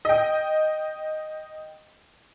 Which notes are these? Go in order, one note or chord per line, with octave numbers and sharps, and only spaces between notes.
D#5 G5